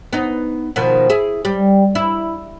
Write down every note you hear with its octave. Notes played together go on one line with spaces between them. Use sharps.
B3 D#4
B2 D#3 F3
E4 G#4
G3
E4